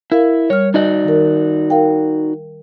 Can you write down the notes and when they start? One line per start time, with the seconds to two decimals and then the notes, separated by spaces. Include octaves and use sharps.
0.12 E4 A#4 F5
0.50 G3 C#5 F6
0.74 D#4 F#4 D5 D#5
1.05 D#3 A#4
1.70 A#4 F5 G5